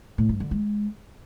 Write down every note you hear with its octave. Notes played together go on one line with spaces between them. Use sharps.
A2
G2
D3
G#3